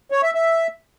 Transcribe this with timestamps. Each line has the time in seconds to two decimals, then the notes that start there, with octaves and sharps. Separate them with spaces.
0.11 C#5
0.23 E5
0.35 E5